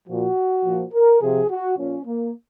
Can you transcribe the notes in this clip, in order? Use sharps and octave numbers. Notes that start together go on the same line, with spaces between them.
A#2 F3 F#4
A#2 F3
A#4
C3 F3 G#4
F#4
A#2 F3 C#4
A#3